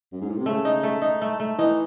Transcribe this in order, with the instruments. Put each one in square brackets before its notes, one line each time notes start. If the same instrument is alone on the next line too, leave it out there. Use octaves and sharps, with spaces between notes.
[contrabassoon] F#2
G#2
A2
C3
[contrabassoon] C#3 [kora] A3
[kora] D#4
A3
D#4
A3
A3
[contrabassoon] E3 [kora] D#4